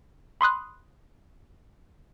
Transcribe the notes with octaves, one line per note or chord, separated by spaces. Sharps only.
B5 C6 D#6 F#6